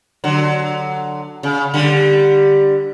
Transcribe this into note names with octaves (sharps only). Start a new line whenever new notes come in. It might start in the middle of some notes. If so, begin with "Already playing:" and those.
D3 F#3
C#3
D3 G3